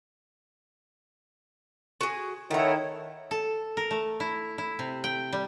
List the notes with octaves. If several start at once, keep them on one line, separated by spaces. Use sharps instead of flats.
F#4 G#4
D#3 A3 E4 C#5 F#5 A#5
A4
A#4
A3
E4
E4
C3
G5
G3